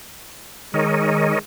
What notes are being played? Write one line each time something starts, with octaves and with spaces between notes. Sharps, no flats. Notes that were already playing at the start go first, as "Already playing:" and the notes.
D#3 G#3 A#4 C#5 D#5